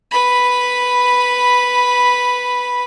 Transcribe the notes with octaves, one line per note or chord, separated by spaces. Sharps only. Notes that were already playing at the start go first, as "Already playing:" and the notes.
B4 B5